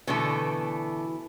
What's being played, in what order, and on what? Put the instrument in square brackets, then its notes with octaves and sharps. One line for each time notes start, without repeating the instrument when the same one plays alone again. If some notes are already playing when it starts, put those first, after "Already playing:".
[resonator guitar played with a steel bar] B2 D3 A3 [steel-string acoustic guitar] E3 E4